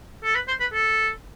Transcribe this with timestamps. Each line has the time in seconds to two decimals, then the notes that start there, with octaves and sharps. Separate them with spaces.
0.24 A4
0.35 B4
0.48 C5
0.60 B4
0.73 A4